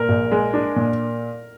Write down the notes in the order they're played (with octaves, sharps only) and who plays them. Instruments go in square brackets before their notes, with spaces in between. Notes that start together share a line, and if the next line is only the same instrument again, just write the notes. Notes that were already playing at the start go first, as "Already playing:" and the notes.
Already playing: [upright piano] A#2 [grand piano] A#4
[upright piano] A#1
G#3
D4
A#2